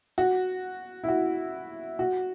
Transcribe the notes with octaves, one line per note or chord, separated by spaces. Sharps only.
F#4
E4
F#4
F#4